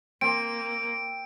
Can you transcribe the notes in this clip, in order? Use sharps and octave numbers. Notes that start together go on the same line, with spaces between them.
A#3 C4 D7